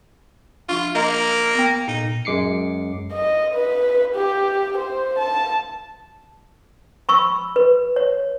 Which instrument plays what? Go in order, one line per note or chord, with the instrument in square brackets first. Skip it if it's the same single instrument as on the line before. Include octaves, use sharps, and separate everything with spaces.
[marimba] F3 D4 [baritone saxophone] F4
[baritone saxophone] A#3 [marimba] D#5 A#5
[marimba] B3 G5
[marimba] A#2 [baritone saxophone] D#4
[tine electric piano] F#2 G#3 D6 C7 C#7
[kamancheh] D#5
B4
G4
C5
A5
[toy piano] B5 C#6 E6
B4
C#5